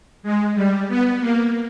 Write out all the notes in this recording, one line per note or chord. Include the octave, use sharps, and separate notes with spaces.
G#3
G3
B3
A#3